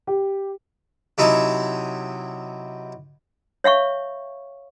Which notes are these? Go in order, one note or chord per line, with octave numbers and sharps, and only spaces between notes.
G4
C3 F#3 D#4 E4 C#5 A5
C#5 E5 F5 C#6